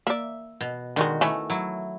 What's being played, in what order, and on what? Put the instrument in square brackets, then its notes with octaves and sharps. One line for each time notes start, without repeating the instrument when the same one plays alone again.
[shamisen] A#3 D5 [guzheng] E5
[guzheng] B2
[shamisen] D3 G#3 [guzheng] D#3 F#4
[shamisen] E3 C#4 [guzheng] A3
[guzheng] F#3 E4